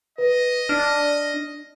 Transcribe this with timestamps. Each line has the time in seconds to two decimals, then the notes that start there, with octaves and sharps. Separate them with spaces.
0.18 B4 D#5
0.69 D4 F6